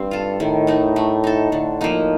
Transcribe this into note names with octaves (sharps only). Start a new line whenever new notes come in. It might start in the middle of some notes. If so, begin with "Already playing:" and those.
Already playing: G2 A3 C4
F4 A4
A2 D#3
A3 D#4
A3
D#4 A4
A2 D3
F3 A#3 D#4